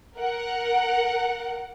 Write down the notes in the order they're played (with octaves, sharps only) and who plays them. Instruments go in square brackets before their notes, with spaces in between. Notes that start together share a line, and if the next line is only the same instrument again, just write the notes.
[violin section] A#4 F#5